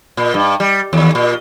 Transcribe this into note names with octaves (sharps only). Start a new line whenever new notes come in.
A#2
G2
G3
D#2
A#2